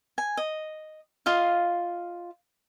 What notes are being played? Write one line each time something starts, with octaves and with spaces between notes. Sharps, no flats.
G#5
D#5
F4 D#5 F5